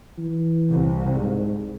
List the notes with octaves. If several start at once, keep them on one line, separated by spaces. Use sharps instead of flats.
E3
C2
G#2